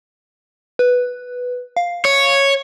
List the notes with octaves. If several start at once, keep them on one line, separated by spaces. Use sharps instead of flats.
B4
F5
C#5